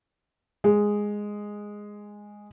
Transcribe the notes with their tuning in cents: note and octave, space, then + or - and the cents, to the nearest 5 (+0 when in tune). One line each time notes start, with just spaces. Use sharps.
G#3 -5